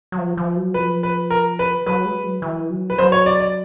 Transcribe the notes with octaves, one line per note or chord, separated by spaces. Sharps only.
F#3
F3
F3
F#3
F3 B4
B4
A#4
B4
F#3 B4
G#3
F#3
E3
F#3
B4
F#3 C5
C#5
D5
D5